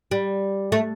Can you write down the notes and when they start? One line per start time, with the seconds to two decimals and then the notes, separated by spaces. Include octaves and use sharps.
0.11 G3
0.72 A3